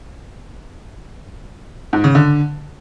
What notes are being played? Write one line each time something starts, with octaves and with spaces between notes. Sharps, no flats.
G#2
C#3
D3